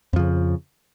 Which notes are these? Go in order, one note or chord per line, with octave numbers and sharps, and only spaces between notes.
F2 C#3 F3